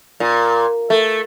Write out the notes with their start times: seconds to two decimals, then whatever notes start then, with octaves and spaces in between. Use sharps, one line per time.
0.20 A#2
0.90 A3